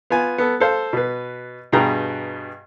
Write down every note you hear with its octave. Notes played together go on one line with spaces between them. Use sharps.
B3 F4 G#5
B3 A4
A4 C5 F5
B2 B4
G2 B2 G#4 B4 G5 A#5